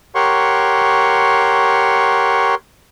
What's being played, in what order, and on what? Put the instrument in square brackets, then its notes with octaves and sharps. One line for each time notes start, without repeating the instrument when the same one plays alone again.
[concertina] G4 A#4 C#5 F#5 C6 C#6